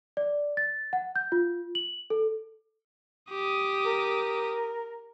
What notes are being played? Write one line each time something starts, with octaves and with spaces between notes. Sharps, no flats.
D5
A6
F#5
G6
F4
F#7
A4
G4 D#6
A#4